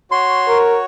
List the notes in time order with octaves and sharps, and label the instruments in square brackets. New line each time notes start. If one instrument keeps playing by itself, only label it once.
[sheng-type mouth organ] F#4 C#5 [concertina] C6
[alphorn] A#4